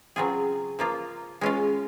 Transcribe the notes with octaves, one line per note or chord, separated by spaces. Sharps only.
C#3 F#3 C4 F4 G#4
F3 A#3 F4
G#3 C#4 F4